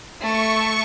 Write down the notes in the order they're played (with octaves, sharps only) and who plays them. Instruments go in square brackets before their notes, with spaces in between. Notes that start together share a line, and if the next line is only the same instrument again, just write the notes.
[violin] A3 [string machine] C#6